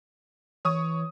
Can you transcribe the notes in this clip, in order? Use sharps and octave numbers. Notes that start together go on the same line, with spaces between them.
E3 C#5 C#6 D#6